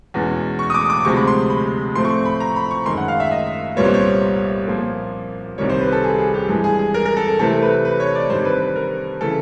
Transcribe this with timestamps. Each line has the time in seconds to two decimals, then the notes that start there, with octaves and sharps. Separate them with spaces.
0.14 E2 B2 G#3 C#4
0.59 C#6
0.70 D#6
0.74 D6
0.90 D6
1.04 D2 C3 F3 G#3 C#6
1.16 B5
1.27 C6
1.50 B5
1.95 A2 F3 A3 C4 C6
2.05 C#6
2.11 C6
2.25 B5
2.40 A#5
2.56 B5
2.71 C#6
2.86 F#2 D#3 G#3 C6
2.97 F#5
3.08 F5
3.20 E5
3.31 D#5
3.76 C2 A#2 G3 B3 C#5
3.85 C5
3.94 C#5
4.67 A#2 F3 A#3
5.58 C2 C3 D#3 G3 C#5
5.69 C5
5.81 B4
5.92 A4
6.04 G#4
6.18 G#4
6.34 G4
6.49 G2 E3 G#3 G#4
6.64 G#4
6.79 G#4
6.94 A#4
7.05 A#4
7.17 A4
7.28 A4
7.39 C3 E3 A3 C4 A4
7.62 B4
7.85 B4
8.00 C#5
8.15 D5
8.30 G2 D#3 G3 C4 C5
8.45 B4
8.61 B4
8.76 A#4
9.21 C#3 E3 A4